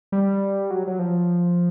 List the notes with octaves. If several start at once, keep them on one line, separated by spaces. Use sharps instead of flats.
G3
F#3
F#3
F3